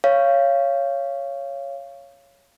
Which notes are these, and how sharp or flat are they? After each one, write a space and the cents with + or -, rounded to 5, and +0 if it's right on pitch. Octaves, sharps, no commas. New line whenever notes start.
C#5 +0 F5 -20